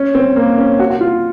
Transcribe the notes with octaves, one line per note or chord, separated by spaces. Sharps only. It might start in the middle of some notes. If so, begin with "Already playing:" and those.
Already playing: C#4
C4
A#3
C#4
F#4
F#4
F4